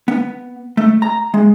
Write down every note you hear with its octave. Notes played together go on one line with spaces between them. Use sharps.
B3
A3
A#5
G#3